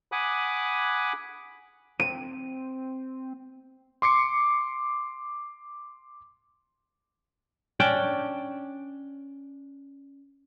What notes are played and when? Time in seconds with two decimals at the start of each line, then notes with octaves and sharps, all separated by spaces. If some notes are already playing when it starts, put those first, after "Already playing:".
0.12 F#5 G#5 B5 D6 D#6 F#6
2.00 C4 D#7
4.02 C6 D6 C7 C#7
7.80 C#4 D4 D5 G5